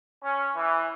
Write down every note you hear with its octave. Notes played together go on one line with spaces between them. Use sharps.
C#4
E3